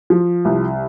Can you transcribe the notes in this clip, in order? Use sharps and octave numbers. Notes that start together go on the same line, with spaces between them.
F3
C2